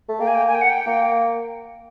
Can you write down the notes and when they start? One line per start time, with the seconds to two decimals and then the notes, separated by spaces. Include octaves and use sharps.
0.09 A3
0.20 A#3 G5
0.27 G#5
0.35 G5
0.47 G#5
0.55 G5
0.61 F#5
0.69 G5
0.87 A#3